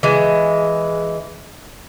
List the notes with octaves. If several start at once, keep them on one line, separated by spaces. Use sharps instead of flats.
E3 G#3